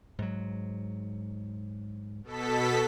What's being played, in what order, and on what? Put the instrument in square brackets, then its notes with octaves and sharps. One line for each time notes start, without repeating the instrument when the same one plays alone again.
[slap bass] G#2 F#3
[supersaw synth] B2 A4 B6